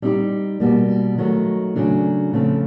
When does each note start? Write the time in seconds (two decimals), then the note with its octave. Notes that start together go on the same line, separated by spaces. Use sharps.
0.02 G3 C4 D#4 G4
0.60 B2 G3 A#3
1.18 D#3 F#3 A3
1.76 C#3 F#3 A3 D4
2.33 C#3 F3 A3 C4